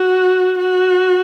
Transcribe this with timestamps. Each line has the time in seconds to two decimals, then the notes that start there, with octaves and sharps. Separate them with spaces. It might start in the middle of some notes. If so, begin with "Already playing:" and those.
Already playing: F#4
0.58 F#4